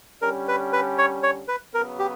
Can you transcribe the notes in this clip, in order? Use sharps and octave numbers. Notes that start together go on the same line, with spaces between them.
D3 G3 C#4 A#4
B4
B4
C#5
C#5
B4
C#3 F#3 B3 A#4
G4